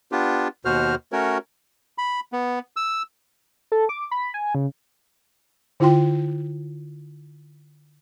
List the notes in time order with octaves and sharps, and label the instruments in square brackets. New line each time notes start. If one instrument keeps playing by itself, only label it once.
[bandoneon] B3 D4 F4 G4
D#2 B2 F#4 C5 F6
A3 C#4 F#4 A#4 C#5
[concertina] B5
B3
E6
[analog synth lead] A4
D6
B5
G#5
C#3
[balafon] D3 E4 F4 G5 C6